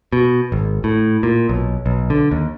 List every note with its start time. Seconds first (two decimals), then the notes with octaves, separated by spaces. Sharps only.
0.13 B2
0.52 G#1
0.84 A2
1.23 A#2
1.49 B1
1.86 B1
2.10 D3
2.31 D#2